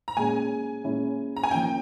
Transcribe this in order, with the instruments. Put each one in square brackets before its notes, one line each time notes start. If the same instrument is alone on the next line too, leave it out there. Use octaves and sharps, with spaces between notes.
[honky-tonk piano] A#5
[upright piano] A#2 G#3 C#4 [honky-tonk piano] G#5
[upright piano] A#2 G#3 C#4 E4 G#4
[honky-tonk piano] A#5
G#5
[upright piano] F3 A#3 C#4 [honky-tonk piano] G5